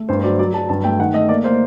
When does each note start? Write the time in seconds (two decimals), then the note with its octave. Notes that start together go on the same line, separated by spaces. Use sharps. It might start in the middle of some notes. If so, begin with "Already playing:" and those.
Already playing: A3
0.09 G2 C5
0.19 C5
0.24 F#3 D5
0.39 F#3 D5
0.53 F#3 A5
0.69 G2 A5
0.84 A3 G5
0.99 D#3 F#5
1.14 A3 D#5
1.29 A#3 D5
1.44 A#3 C5